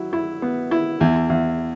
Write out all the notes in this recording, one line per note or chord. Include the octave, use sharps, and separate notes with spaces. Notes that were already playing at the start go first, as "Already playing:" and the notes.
Already playing: F#3 E4
E4
B3
E4
E2
E2